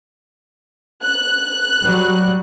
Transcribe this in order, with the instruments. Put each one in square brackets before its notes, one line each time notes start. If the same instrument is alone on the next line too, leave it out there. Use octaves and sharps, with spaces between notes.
[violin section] F#6
[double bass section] F#3 G3